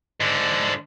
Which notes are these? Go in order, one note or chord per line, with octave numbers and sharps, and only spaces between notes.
G#2 D3